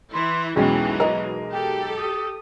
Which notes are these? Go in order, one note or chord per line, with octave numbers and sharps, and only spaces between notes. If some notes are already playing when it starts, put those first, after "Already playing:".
E3 E4 C6
B1 E2 E3 F#3 G#3 C#4 G5
A#4 B4 D#5
G4 A4 G5
D#6